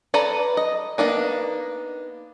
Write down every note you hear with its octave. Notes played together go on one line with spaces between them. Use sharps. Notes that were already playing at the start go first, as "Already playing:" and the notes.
A4 B4 D5 A5 A#5
D#5
A#3 B3 D4 D#4